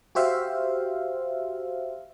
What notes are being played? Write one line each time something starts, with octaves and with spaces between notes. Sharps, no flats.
F#4 G4 C5 E5 F5